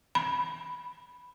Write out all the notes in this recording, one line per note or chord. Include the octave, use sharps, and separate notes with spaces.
B5